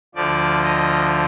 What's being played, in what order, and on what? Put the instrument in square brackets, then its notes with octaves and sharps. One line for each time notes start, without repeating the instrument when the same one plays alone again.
[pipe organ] D2 D3 F3 D5
D#5